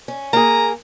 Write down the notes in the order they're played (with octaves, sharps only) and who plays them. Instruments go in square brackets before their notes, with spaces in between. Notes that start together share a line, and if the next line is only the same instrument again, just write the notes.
[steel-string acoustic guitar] C#4
[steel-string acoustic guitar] A#3 G#4 [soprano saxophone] A#5